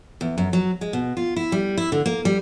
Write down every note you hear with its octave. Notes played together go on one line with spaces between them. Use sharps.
E2
F#2
F#3
G#3
B2
F4
E4
G3
E4
D3
A#3
G3